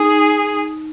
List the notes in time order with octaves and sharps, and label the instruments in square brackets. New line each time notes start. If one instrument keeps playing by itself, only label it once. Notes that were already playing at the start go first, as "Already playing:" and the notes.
Already playing: [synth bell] D#4 [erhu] G#4